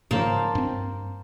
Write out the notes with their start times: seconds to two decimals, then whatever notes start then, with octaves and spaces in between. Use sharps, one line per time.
0.11 G#2 C#3 F3 A#3 C5 A5
0.55 G2 C4